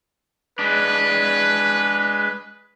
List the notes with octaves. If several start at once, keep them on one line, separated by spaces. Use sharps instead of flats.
G#3 D4 B4